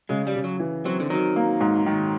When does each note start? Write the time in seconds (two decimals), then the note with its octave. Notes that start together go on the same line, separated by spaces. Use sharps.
0.09 C#3 G#3
0.27 G3
0.35 C#3
0.44 F#3
0.60 E3
0.85 F#3 C4
1.00 D3
1.10 D#3 F#3
1.36 A#3
1.61 G#2
1.86 D#3